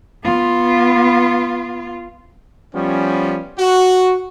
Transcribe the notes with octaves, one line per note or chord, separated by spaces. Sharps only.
B3 F4
F3 G3 B3 C#4
F#4